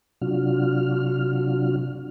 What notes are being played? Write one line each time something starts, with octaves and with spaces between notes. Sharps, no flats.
C3 F#3 D4 F4 F#4 F6